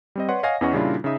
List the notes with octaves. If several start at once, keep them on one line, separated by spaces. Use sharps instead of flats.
G3 C4 D#5
B4 C#5 D5 F#5 C6
C#5 D#5 F5 F#5 G#5 A#6
E2 E3 C#4 D#5 F#5 C#6
A#2 C#3 G3 D4 E4 F4
C#3 D#4 E5 D#6